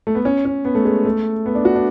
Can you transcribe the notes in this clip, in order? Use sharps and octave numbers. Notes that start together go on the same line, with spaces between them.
A3
B3
C#4
C#4
B3
A3
G#3
A3
B3
D4
F#4
D4